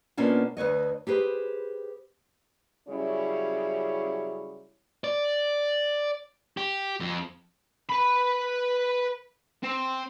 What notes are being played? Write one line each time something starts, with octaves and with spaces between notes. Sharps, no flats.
B2 A#3 C#4 D4 F4
D2 B4 C#5 D#5
G4 G#4 B4 C5
C#3 F#3 G3 C#4 E4 C#5
D5
G4
F2
B4 B5
C4